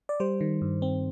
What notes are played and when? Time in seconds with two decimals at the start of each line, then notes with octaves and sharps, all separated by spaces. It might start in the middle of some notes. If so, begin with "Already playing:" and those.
0.09 D5
0.20 G3 C5
0.41 D#3
0.62 G2
0.82 C4